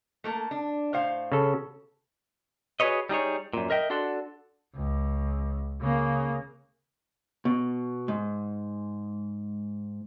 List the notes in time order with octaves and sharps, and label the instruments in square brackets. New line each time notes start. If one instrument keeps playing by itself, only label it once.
[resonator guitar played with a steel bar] A3 A#3 A4
D4
A2 C5 F5
[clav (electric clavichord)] C#3 A4
[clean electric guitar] F#4 G#4 A4 B4 C#5 D#5
G3 D#4 G#4 C#5
F#2 A#2
A#4 D#5 E5 G5
D4 F#4 A4 C6
[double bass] C#2
C#3 A#3
[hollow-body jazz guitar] B2
G#2